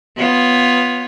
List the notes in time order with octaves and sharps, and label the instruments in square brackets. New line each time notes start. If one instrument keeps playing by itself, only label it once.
[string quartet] B3 F4 C#5